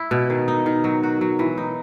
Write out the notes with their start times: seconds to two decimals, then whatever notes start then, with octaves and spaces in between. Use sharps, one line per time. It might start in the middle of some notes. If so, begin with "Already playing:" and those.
Already playing: E4
0.11 B2
0.30 D#3
0.48 D#4
0.66 D#3
0.84 F#3
1.03 F#4
1.21 F#3
1.39 E3
1.58 D#4